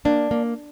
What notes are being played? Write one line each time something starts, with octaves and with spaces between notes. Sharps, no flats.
A#3 D4
A#3